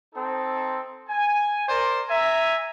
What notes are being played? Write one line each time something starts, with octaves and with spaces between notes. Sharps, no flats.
C4 D#4 A4
G#5
A#4 C5 D5
E5 G#5 A#5